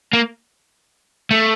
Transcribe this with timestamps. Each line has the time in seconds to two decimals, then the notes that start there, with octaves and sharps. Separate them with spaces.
0.13 A#3
1.31 A3